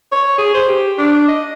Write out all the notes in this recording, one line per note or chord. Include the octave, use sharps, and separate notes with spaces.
C#5
G#4
C5
G4
D4
D#5